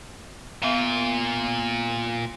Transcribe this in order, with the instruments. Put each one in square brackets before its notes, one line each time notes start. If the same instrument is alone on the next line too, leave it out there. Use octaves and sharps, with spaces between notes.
[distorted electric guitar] A#2 F4 [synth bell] B3 F5 D#7